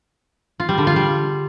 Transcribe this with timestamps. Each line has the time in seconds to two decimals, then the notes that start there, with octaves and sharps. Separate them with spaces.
0.60 F4
0.69 G3
0.78 D3
0.87 F4
0.96 G3